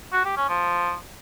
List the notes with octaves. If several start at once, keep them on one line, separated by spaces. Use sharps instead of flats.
F#4
G4
C#4
F3